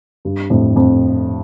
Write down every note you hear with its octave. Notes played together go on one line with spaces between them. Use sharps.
G2
F2 A2
F2